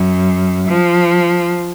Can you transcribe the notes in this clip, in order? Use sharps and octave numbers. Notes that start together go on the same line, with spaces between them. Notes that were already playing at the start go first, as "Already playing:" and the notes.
Already playing: F#2
F3